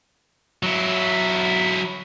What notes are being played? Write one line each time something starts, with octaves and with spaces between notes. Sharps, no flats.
F#3 E4